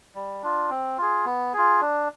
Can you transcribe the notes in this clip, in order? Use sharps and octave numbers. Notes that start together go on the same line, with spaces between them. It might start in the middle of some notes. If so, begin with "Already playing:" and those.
G3
D4 F4
C4
F4 G#4
B3
F4 G#4
D4